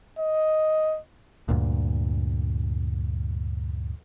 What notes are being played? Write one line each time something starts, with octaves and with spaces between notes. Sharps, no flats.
D#5
D2 G2 A#2